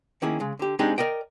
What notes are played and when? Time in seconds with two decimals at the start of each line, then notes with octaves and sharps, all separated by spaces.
0.22 D#3 A#3 C#4 E4 G#4
0.40 C#3 G#3
0.59 D3 G4
0.79 G#3 C4 D4 D#4 G4 G#4
0.98 A#4 D5 D#5 G5